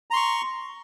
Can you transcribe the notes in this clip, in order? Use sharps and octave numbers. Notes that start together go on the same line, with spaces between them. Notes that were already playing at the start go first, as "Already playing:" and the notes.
A#5 C6 C#6